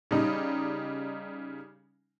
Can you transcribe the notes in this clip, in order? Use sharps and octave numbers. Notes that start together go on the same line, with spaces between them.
C#3 G3 D#4